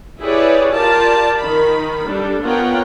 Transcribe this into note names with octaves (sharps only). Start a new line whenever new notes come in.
E4 G4 G#4 B4 C#5 D5
F4 G4 A#4 D5 A5
D#3 B5
G3 D4 A4
B3 F4 A#4 C#5 F#5 G5